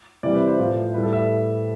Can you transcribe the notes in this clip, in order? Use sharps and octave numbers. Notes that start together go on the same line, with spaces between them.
C3 E3 G3 D5
B4
C5
A2 F3
A2 G3 B4
A4
E5